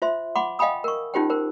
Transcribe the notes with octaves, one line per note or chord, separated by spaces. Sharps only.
F4 C5 E5 C6
F#5 B5 C6 D6
D#5 F5 G5 G#5 B5 D#6
A#4 C#6
C#4 D#4 F4 G4 C5 G5
A#4 C5